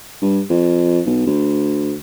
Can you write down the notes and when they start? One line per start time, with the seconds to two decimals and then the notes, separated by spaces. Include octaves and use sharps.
0.22 G2
0.49 F2
1.06 B1
1.27 D2